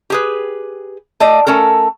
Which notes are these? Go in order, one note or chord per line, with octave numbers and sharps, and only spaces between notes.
G4 G#4 B4
A3 D5 D#5
A3 C#4 A4 A#4